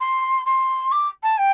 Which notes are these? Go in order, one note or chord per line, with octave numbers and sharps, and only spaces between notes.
C6
C6
D6
A5
G5